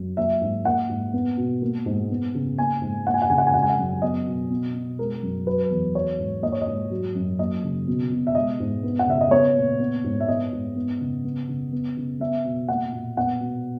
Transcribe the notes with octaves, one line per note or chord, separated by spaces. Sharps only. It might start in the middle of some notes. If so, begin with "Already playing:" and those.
Already playing: F#2
A#3 E5
G#2
A#3 F#5
G#2
B3
B2
A#3
G#2
B3
C#3
A#3 G#5
G#2
A#3 F#5
G#5
F#5
C#3 G#5
F#5
G#5
G#3 F#5
G#5
F#5
F#2
B3 D#5
B2
B2
B2
G#3 A#4
F#2
F#3 B4
E2
F#3 C#5
G#2
A#3 D#5
C#5
D#5
G#2
F#3
F#2
A#3 D#5
C#3
B2
B2
E5
G#3 D#5
G#2
B3
F#5
C#3 E5
D#5
B3 C#5
A#2
B3
G#2
E5
B3 D#5
G#2
B3
C#3
B3
C#3
B3
C#3
B3 E5
B2
A#3 F#5
A#2
B3 F#5
B2